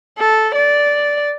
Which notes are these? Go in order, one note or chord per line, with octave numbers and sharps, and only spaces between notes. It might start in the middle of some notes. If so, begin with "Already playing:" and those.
A4
D5